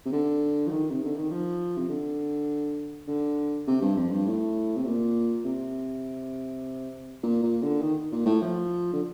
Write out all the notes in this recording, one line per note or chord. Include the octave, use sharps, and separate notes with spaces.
C3
D3
F3
D#3
C3
D3
D#3
F3
C3
D3
D3
C3
G2
F2
G2
A2
C3
A#2
C3
A#2
A#2
D3
D#3
A#2
A2
F3
D3